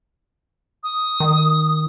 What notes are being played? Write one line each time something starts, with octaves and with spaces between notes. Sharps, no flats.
D#6
D#3